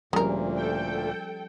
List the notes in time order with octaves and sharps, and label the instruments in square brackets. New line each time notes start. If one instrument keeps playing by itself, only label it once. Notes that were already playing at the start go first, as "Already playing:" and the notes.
[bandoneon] D2 A#2 [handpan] F3 G3 C#4 [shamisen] G#3 A#4
[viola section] A4 G5